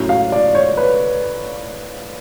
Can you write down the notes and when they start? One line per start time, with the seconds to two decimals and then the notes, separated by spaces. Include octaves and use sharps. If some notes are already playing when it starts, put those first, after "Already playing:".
Already playing: A2 F#3 C#4
0.09 F5
0.32 D5
0.55 C#5
0.77 B4